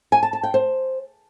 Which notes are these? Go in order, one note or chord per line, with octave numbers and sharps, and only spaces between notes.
G#5
A5
A5
G5
C5